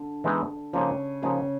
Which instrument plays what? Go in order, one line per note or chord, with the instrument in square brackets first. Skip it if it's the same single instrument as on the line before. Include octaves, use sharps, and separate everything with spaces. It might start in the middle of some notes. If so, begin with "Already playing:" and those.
Already playing: [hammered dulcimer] D3
[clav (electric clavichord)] E3 G#3 B3 D#4
[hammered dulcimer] C#3 [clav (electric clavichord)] F3 A#3 D#4 G#4
[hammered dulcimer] C#3 [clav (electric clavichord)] F3 A#3 D#4 G#4